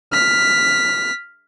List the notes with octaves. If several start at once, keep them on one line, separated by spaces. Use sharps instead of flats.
F6 B6